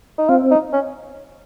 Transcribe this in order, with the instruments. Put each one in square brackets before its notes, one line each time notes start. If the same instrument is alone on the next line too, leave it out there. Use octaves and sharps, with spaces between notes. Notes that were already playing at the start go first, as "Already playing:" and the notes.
[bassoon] D#4
[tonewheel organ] C4 [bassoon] F4
[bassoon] D#4
C#4